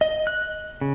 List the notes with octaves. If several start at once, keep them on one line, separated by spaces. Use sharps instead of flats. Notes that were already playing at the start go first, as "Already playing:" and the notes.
D#5
F#6
C#3